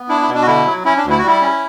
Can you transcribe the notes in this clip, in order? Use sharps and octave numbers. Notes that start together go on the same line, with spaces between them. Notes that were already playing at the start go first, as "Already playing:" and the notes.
Already playing: B3
D4 E4
E4
B2
D4
F#4
D3 E4
F#3
C#4 E4
D4
D2
E4
F#4
G3 E4
C#4